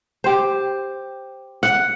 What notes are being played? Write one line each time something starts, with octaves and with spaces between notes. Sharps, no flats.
G4 C5
F#5